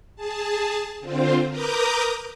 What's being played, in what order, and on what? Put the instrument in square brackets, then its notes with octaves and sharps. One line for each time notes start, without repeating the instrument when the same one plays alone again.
[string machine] G#4 A5
D3 C4 F4 C5
A#4 B4 A#5 D6 D#6 G6